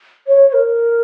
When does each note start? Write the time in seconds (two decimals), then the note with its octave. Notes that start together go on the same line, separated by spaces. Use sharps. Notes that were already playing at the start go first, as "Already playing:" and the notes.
0.27 C#5
0.48 C#5
0.53 A#4